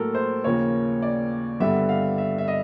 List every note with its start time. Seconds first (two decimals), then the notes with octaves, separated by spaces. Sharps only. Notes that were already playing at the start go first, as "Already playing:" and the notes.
Already playing: A2 F#3 A#3 A4 A#4
0.15 C5
0.44 D#2 C#3 F3 A#3 C#5
1.02 D5
1.60 G2 D3 G3 B3 E5
1.89 F5
2.18 E5
2.38 E5
2.48 D#5